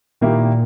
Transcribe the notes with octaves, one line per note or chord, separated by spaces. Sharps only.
A#2 D#3 A#3 E4 G4